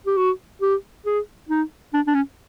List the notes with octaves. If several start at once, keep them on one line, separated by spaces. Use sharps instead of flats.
G4
F#4
G4
G#4
D#4
D4
D4
C#4